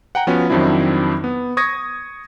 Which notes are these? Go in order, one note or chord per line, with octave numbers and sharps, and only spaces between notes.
F#5 G5 A#5
F3 B3 C#4 F#4
F2 D#3 F#3 C4 D4 E4
B3
C#6 D#6 G#6 A#6